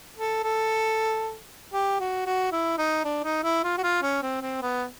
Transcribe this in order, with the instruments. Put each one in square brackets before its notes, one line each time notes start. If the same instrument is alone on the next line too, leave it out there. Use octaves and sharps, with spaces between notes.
[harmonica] A4
A4
G4
F#4
F#4
E4
D#4
D4
D#4
E4
F4
F#4
F4
C#4
C4
C4
B3